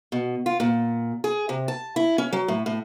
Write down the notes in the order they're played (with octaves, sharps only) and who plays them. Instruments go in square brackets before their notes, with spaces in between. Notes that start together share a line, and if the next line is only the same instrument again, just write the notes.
[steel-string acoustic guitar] B2
F4
A#2
G#4
C3
A5
E4
C#4
F#3
A2
A2